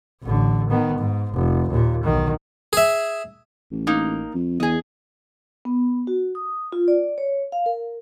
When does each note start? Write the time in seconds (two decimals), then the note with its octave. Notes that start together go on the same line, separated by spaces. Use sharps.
0.23 A1 D3
0.70 D#3 B3
0.99 G#2
1.33 F1
1.70 D#2 A#2
2.03 B1 D#3
2.73 G#4 E5
3.71 A1
3.87 A#3 D#4
4.35 F2
4.60 E2 G#4 D#5
5.65 B3
6.07 F#4
6.35 D#6
6.72 F4
6.88 D5
7.18 C#5
7.52 F5
7.66 A#4